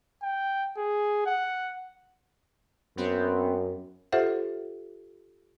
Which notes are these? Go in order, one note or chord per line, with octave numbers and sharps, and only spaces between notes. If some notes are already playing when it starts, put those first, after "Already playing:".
G5
G#4
F#5
F#2 B3 C4
F4 G4 A4 C5 E5 F#5